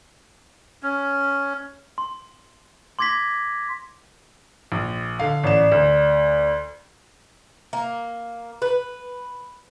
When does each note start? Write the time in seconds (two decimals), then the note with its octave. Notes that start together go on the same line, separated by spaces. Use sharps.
0.83 C#4
1.98 C6
2.99 C6 D6 G#6 A#6 B6
4.72 A#1
5.19 D3 F5
5.43 A1 D5 E7
5.72 D2
7.73 A#3
8.62 B4